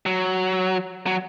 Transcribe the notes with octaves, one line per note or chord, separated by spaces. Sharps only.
F#3
F#3